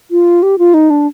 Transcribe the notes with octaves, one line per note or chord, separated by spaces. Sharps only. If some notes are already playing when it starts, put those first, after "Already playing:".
F4
G4
F4
D#4
D4